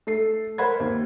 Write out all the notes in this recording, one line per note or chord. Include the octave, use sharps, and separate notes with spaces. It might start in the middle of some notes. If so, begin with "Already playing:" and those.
A3 A4 C7
A#4 C5 F#5 B5 G#6
D#2